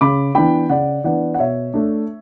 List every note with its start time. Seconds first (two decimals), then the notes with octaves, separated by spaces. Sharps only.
0.01 C#3 B5 D6
0.35 E3 B3 D4 G5 B5
0.70 C#3 D5 F#5
1.04 E3 B3 D4 D5 F#5
1.34 F#5
1.39 B2 C#5 E5
1.74 A3 D4